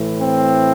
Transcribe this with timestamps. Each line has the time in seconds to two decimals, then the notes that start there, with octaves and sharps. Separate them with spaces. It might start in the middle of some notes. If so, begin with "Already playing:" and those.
Already playing: A2 E3
0.18 C4